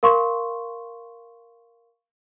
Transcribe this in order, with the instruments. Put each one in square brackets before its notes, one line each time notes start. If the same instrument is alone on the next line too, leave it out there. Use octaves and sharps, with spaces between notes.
[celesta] A#4 F5 C6 C#6